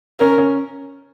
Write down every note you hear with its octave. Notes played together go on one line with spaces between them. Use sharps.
C#4 A#4
C#4